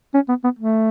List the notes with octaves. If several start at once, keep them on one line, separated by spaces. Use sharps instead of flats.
C#4
B3
B3
A3